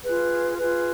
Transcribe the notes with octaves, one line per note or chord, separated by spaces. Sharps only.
F4 G#4 B4
F4 G#4 B4